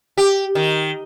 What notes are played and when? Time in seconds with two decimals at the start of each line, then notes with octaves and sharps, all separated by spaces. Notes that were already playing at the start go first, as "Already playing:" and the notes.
0.18 G4
0.55 D#3